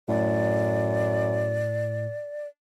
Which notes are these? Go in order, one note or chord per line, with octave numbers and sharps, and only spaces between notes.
F#2 A2 D5